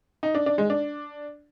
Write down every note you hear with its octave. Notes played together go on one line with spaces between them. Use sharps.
D#4
D4
D4
G#3
D4